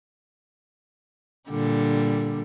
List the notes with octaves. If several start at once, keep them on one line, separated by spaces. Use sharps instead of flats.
A#2 D3 G3